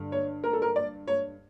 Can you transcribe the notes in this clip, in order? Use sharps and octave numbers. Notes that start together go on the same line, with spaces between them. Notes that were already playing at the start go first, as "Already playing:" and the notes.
Already playing: G2 D3
C#5
A#4
A4
A#4
D5
C#5